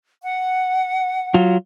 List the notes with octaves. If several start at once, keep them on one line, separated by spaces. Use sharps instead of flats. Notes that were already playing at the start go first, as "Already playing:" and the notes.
F#5
F#3 F4